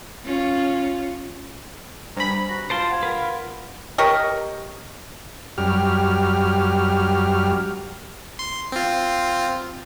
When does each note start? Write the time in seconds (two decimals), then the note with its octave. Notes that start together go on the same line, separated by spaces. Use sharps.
0.25 C#4 F4
2.17 G2 C5 G#5 A#5 B5
2.49 F#4 A#6
2.70 F4 C5 A5 C6 D7
2.91 F#5 G#6
3.03 A#4 B4
3.98 G4 A#4 C#5 D#5
5.58 F#2 G3 F6
8.39 C6
8.72 C4 F4